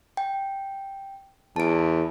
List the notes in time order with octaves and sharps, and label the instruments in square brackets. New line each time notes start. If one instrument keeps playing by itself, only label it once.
[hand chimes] G5
[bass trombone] E2 [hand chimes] A5 D7